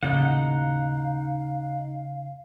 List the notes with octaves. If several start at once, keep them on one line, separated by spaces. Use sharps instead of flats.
D#2 A2 C#3 D#4 F5 F#5